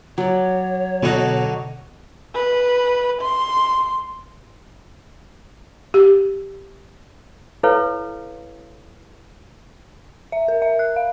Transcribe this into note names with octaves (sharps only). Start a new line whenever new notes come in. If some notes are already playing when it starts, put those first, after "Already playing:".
F#3 C#5 D5
B2 D3 F#3 D#4 F#4 D5
B4
C6
G4
E4 A4 B4 C#5 F5
E5
A#4
E5
F#6
F5